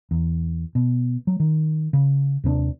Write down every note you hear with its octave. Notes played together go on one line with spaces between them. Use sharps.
E2
B2
F#3
D#3
C#3
D#2 C3 G3 D4